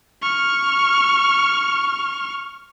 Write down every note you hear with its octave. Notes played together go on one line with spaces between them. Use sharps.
C#6 F6